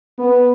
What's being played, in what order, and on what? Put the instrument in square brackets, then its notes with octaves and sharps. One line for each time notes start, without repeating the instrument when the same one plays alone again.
[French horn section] B3